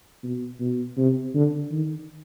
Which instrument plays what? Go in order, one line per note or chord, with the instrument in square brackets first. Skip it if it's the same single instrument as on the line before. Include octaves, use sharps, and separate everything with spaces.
[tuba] B2
B2
C3
D3
D#3